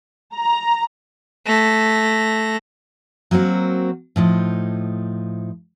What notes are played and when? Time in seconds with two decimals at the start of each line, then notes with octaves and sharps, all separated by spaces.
0.35 A#5
1.46 A3 A#6
3.31 F#3 A#3 C4 F#4
4.16 A2 F3 D#4